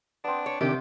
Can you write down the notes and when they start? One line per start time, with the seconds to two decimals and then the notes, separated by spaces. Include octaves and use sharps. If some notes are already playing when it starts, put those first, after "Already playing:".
0.24 B3 C4 D4
0.46 C#5
0.61 C3 D#3 D4 G4